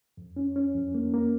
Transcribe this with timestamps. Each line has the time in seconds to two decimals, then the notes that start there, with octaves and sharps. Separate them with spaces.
0.17 F2
0.36 C#4
0.56 C#4
0.75 F2
0.94 A#3
1.14 A#3